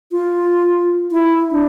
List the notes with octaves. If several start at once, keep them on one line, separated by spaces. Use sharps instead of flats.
F4
E4
D4